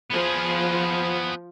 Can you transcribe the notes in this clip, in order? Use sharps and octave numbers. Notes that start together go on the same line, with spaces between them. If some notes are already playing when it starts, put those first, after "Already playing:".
F3 B3 G#4